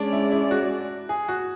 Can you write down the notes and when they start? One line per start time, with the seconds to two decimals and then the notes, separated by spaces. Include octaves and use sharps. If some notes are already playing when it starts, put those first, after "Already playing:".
Already playing: G#3 C#4 D4 G#4 D5
0.12 E4
0.32 E4
0.51 F#4
1.09 G#4
1.28 F#4